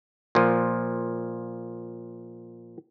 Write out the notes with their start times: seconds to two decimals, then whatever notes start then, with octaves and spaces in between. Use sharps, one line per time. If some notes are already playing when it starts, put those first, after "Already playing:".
0.35 A#2 F3